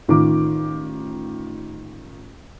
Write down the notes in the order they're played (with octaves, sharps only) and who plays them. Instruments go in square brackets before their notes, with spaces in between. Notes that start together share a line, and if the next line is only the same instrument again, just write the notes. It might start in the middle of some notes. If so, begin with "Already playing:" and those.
[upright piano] A1 D#3 F4 D6